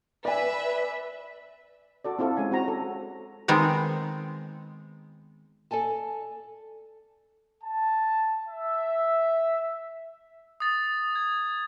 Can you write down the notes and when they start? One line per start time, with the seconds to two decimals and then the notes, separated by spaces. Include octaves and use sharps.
0.25 B4 D5 E5 G#5
2.05 F#4 A4 D5
2.19 C4 E4 F4 A4
2.37 G#3 C#4 G#5
2.52 C4 F#4 A#5
2.65 F#4 A4
3.48 D#3 G#3 B3 C4
5.71 A4 D5 G#5 A5
7.64 A5
8.48 E5
10.60 D#6 A6
11.15 G#6